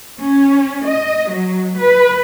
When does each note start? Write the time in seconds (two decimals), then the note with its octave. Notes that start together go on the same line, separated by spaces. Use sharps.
0.19 C#4
0.86 D#5
1.30 F#3
1.79 B4